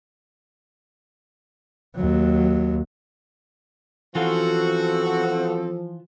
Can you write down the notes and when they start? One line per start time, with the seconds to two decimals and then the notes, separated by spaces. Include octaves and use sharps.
1.96 D#2 F#3
4.15 E3 F3 B3 C4 F4 F#4 A4